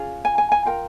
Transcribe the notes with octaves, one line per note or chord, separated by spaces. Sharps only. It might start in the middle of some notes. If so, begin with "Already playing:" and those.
Already playing: C#4 F4 G#4
G#5
G#5
G#5
F4 A#4 G5